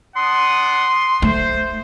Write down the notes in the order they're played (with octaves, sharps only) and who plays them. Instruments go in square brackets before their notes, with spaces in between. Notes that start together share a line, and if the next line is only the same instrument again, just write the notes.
[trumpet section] D4 F#5 D#6 [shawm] C6
[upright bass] A3 [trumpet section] C5